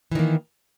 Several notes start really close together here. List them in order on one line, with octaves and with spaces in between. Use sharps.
E3 D#3 A#3